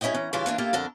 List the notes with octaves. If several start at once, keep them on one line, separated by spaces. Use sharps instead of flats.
G2 C#4 E4 C5 D#5 G5
E3 C#4 A#5
G2 C#3 E3 E4 F4 D5
E3 A#3 D4 F4
A#3 E4 F4 G4 A4
F2 D3 A4 A#4